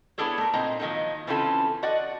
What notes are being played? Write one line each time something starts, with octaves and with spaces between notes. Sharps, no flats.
B3 D4 E4 G#4 A4 C#5
A3 A#4
A#2 C4 D#4 A#5
D#3 F3 F#3 A#3 D#4
C#3 E3 C4 C#4 F4 A4
F#4 D5 D#5 F#5